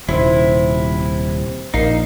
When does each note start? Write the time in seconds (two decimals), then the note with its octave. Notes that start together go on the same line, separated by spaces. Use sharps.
0.09 D#1 C3 E4
1.74 A#1 A#3 D#4 C7